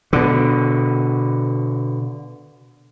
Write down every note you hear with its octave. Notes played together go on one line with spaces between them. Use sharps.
B2 D3